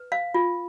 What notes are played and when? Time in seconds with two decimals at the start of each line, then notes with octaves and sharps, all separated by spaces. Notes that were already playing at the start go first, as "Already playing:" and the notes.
Already playing: B4
0.12 F5
0.34 F4